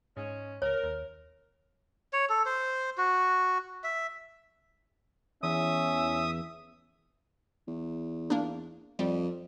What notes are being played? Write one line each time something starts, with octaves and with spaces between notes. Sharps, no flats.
G#2 G#3 C#4
C#2 A#4 C#5
D#2
C#5
A4
C5
F#4
E5
E2 C#4 E5 D#6
E2
A#3 D4
F2 G3